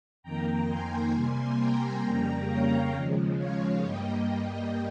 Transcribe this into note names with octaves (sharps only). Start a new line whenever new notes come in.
F2 D#3 A#3 G5 A#5
G#5 C6
C3 G3 A#3
G5 A#5
F2 C#3 G3 A#3
C#5 F5
D#2 C#3 F3 G#3
C#5 F5
G2 G3 A#3 D#5 G5